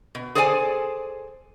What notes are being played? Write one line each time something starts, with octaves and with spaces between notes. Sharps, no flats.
B2
G#4 A4 C5 D5 G5 G#5